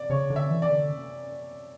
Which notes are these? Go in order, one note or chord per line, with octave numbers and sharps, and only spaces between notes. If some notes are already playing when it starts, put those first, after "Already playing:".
Already playing: D5
C#3 C#5
D3
E5
E3
D5
D3